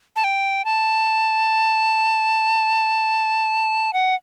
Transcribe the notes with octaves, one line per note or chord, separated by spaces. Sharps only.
A5
G5
A5
F#5